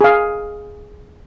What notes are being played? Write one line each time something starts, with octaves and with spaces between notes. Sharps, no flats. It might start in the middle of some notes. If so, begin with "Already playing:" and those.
G#4 F5